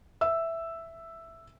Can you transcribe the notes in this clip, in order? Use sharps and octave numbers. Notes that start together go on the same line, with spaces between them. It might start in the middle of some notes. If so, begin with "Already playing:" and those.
E5 E6